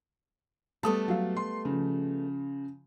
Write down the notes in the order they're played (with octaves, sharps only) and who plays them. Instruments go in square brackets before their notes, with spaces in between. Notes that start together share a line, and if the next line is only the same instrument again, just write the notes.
[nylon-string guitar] G3 A3 B3 [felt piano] A5 D#6
[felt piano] F#3 F5
C6
C#3 F3